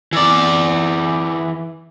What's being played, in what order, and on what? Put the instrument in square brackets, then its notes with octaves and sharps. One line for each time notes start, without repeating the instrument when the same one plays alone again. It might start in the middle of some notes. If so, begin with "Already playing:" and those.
[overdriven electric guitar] E3 D5